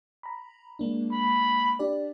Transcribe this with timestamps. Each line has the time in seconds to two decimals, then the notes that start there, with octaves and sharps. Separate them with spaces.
0.23 A#5 B5
0.79 G#3 A#3 D4
1.12 B5
1.79 D4 G4 D5